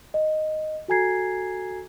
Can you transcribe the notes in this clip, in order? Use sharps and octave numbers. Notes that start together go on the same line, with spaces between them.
D#5
F#4 A4 G#5 A#5 G#6 C7